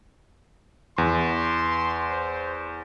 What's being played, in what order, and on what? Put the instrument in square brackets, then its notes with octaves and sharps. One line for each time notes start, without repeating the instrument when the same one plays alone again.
[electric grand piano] E2 [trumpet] C6
[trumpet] C5